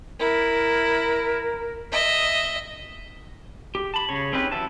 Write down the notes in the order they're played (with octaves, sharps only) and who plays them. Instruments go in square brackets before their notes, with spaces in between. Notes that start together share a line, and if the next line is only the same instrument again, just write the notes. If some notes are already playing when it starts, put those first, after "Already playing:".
[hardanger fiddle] E4 [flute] A#4
[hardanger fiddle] D#5 E5
[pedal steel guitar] G4
A5 B5
C#3 C#5
C4 C#4 D#4 G4 B4
E3 F#3 E5 A5